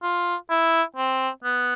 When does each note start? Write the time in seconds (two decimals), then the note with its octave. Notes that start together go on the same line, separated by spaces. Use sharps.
0.03 F4
0.49 E4
0.96 C4
1.44 B3